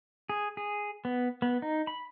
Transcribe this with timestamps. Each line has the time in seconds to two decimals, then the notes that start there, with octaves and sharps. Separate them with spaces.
0.29 G#4
0.57 G#4
1.05 B3
1.42 B3
1.62 D#4
1.87 B5